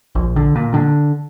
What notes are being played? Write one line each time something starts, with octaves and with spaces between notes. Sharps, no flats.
A#1
D3
A#2
D3